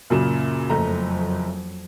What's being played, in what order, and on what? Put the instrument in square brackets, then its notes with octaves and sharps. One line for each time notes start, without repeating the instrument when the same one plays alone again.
[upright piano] F#2 A#2 C#3
[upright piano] F#1 A3 A#5 [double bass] F2 F#3